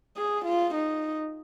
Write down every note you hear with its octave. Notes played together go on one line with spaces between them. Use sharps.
G#4
F4
D#4